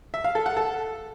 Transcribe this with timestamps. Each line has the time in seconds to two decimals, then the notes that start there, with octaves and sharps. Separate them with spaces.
0.14 E5
0.24 F5
0.35 A4
0.46 F#5
0.57 A4